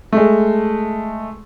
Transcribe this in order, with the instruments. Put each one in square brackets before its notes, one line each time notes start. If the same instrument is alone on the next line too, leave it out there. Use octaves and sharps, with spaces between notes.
[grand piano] G#3 A3